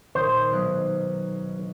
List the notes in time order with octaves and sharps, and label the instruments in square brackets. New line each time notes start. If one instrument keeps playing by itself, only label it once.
[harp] A#2 D#3 [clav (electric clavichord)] C5
[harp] B1 G#3 F#6